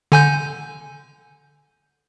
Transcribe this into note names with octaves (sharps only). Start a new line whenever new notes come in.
D3 G#5 G6